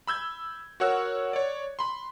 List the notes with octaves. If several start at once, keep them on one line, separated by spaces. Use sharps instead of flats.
B5 E6 G6 G#6
F#4 A#4 C#5 F#5 E6 F#6
C#5 D5
B5 C6